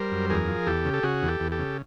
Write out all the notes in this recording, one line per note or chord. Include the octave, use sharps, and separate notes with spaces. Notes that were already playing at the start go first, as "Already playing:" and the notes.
Already playing: G3 A#4 C5
F#2
E2 G#4 A#4
F3
E2 G4 A4
C#3
A4
C#3 F#4 G#4
E2
G4 A4
E2
G4 A4
C#3